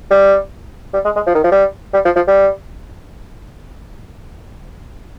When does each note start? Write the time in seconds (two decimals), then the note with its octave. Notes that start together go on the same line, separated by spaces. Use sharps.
0.11 G3
0.94 G3
1.05 G#3
1.16 G#3
1.26 F3
1.35 D#3
1.44 F3
1.52 G3
1.93 G3
2.05 F3
2.16 F3
2.28 G3